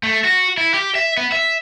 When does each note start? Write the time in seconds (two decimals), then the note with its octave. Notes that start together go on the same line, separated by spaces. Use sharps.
0.03 A3
0.24 F#4
0.58 E4
0.74 G4
0.95 E5
1.17 B3
1.32 E5